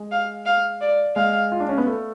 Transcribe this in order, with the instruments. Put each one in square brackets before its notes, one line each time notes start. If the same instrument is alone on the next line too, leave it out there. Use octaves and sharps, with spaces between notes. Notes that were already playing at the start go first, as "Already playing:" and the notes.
Already playing: [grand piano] G#3
[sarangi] F5
F5
D5
[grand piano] G#3 [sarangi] F5
[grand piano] F4
D4
C#4
B3
A3